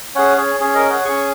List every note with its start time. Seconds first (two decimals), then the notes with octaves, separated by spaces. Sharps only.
0.15 C#4 G#4 C#5 F#5
0.37 G#4 C#5
0.60 C#4 G#4 C#5
0.75 A#4 D#5
0.90 C#5 F#5
1.05 C#4 G#4 G#5 C#6